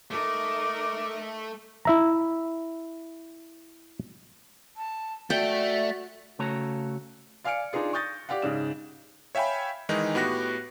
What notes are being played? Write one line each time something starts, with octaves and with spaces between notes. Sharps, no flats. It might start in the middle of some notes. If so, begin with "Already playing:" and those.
A3 D#4 A#4 D6
E4 E5 A#5
A5
A3 F#4 D5 E5 G5
C#3 A3 F#4 A4 C#5 A#5
D5 F5 G#5 F6 C#7 D7
D4 D#4 F4 G#4 D5
C#6 D#6 G6 A6 A#6
G4 D5 F5 F#5
G#2 C#3 E7
C#5 E5 F5 G5 G#5 B5
D#3 E3 G#3 D#4
A2 B3 F#4 G4 F#6 A#6